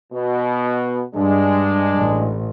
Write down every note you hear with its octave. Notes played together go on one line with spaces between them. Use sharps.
B2
G2 G#3 D4
A1